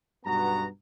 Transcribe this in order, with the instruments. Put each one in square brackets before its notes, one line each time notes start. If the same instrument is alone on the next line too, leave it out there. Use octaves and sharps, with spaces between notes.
[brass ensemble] B1 G2 B3 F#4 A#5